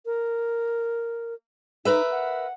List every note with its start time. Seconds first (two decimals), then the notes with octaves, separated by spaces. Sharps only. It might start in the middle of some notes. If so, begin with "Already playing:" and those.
0.06 A#4
1.85 D#4 A#4 B4 E5
2.11 F#5